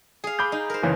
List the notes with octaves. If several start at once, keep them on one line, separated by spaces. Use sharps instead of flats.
G#4 F5
B5 D6 G6
D#4
A#4 C5
F#1 C#3 E3